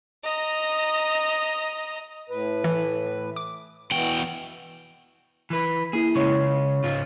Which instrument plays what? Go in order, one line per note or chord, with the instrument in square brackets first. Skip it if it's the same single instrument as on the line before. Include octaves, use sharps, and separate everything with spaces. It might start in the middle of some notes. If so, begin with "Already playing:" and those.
[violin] D#5 A#5
[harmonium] A2 B4
[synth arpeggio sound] E3
D6
[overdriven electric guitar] E2 G5 [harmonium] B2 E3 F#4
[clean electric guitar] E3 B4
[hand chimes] A#3 E4 [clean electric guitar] G#4
[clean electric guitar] C#3 G#3 [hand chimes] C#5 C#6
[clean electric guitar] C#2 G#2 F4